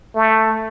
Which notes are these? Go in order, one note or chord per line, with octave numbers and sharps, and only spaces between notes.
A3